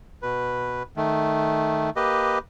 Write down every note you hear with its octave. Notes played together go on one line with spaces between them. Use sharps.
B2 B4
D#3 A3
A#3 G4 B4 D#5